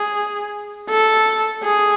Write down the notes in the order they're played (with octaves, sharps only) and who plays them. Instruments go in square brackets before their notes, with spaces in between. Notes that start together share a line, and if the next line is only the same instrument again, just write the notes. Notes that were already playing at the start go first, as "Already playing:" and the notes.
Already playing: [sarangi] G#4
A4
G#4